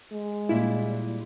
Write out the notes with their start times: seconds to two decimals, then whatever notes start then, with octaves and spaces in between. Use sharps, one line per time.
0.12 G#3
0.49 A#2 G3 D4 E4